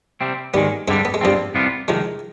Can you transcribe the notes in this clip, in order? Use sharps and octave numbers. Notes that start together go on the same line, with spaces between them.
C3 G3 C4
G#2 D#3 G3 G#3 B3
G2 D3 G3 G#3 C4
B3
G#3
G2 F3 G3 B3 C4
C2 C3 G3 B3 F4
C2 C3 D#3 F3 G#3